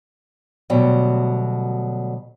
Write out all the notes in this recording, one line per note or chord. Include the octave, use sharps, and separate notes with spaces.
D2 B2 F#3 G3